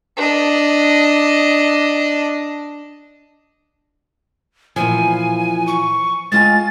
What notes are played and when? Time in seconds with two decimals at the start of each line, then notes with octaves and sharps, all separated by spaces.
0.17 D4 D#5
4.76 A#2 E3 F3 G#5
5.67 C#6
6.32 G#3 F4 G#5 A6